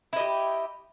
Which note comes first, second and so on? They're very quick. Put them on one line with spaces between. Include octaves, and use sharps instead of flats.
E4 D#5 G4